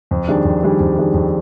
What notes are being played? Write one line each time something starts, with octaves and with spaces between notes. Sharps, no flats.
F2
D#3 G3 D4 G#4
F2
D#3 G3 D4 G#4
F2
D#3 G3 D4 G#4
F2